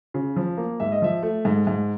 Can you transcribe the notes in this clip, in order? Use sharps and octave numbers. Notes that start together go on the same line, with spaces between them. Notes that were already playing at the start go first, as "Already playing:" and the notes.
C#3
F3
A#3
G#2 E5
D#5
F3 E5
A3
G#2
G#2